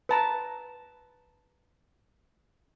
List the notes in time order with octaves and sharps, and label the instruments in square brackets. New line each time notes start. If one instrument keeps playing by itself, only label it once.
[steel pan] B4 A5 A#5